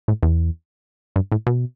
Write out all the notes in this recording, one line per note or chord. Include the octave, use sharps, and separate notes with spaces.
A2
E2
G2
A2
B2